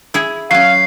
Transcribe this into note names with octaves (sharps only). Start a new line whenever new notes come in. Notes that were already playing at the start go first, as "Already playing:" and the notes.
E4 G#4
F#3 C#4 F5 C7